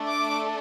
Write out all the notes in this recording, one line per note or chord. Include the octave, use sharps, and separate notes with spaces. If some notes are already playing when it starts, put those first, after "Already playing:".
Already playing: A3 D4 A4
D6